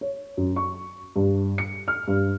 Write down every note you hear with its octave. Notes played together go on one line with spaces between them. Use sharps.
C#5
F#2
C#6
G2
C#7
F6
G2